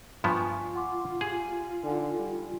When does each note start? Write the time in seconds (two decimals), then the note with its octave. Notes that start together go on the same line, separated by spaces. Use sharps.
0.24 G2 F3 B3 F4 G#5 C#6
0.75 F#5 C6 D6
1.21 G4 G#4 G#5
1.84 D3 D#4 G#5
2.19 G3